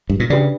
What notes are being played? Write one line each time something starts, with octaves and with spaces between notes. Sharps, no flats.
G2
A#2
C#3 D4 G4 B4 D5